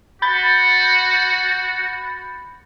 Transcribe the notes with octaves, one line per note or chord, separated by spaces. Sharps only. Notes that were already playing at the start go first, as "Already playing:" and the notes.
F#4 B5 G6 A6